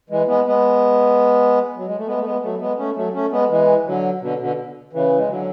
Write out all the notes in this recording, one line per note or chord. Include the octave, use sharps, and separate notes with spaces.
E3 G#3
G#3 B3
G#3 B3
F#3
G#3
A3
G#3 B3
A3
G#3 B3
F#3 A3
G#3 B3
A3 C#4
F#3 A3
A3 C#4
G#3 B3
E3 G#3
D3 F#3
B2 D3
B2 D3
C#3 E3
G#3
D3 F#3